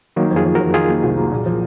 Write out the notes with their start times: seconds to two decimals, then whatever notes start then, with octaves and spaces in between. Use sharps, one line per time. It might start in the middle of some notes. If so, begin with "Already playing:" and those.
0.16 D#3 F#3 A#3
0.31 F2
0.36 F4 G#4
0.45 F2
0.55 F#4 A#4
0.60 F2
0.74 D#3 F4 G#4
0.88 A#3
1.03 C2
1.17 A#3
1.32 A#2
1.46 F3